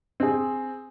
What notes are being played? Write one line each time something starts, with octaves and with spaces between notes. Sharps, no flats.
C4 G#4